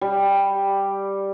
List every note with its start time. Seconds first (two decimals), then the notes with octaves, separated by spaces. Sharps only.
0.01 G3